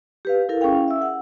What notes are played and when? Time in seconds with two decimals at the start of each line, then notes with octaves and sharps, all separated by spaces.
0.25 G4 B4 F5
0.49 E4 A4 A#4 F5
0.61 C#4 E4 G#4 F5 G5
0.88 E5 E6
1.02 F#5